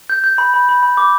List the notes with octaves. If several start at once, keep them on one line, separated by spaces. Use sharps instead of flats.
G6
G6
B5
B5
B5
B5
D6